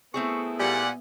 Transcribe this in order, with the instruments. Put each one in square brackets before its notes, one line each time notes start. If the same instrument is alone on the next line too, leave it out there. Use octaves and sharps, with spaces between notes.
[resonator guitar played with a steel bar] A3 C4 G#4 [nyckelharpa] B3 E4 [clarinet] C#6
[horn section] A#2 G3 F#5 [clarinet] G#5